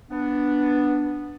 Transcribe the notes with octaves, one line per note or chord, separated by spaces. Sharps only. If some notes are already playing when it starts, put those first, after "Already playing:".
B3 D4